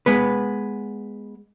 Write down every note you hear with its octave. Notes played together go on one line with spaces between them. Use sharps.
G#3 B3 B4